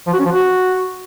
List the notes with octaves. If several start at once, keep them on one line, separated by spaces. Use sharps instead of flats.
F3
F#4
C#4
F3
F#4